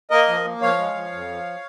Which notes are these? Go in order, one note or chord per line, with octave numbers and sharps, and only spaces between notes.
A#3 A#4 D#5
F3
A#3
F3 C#5 F5
G#3
F3
F2
F3